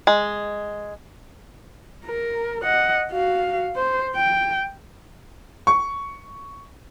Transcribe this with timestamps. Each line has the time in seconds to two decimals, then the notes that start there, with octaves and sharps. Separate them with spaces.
0.07 G#3
2.06 A#4
2.63 D#5 F#5
3.11 F#4 F5
3.75 C5
4.15 G5
5.67 C#6